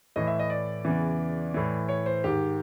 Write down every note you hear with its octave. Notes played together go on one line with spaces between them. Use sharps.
A2 E3 D#5
E5
D#5
D5
E2 C#3 E3
A2 E3
C#5
C5
G#2 D#3 G4